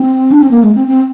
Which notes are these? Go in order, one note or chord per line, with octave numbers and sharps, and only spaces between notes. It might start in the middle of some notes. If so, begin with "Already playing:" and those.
Already playing: C4
D4
C4
A#3
G#3
C4
C4